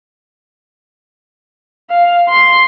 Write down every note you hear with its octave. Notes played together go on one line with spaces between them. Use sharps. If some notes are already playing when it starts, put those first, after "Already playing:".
F5
C6